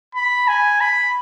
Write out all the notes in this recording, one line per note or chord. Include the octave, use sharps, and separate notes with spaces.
B5
G#5
B5